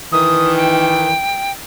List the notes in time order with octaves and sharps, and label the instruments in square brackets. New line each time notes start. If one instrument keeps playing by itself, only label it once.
[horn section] D#3 E3 [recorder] D#6
[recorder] G5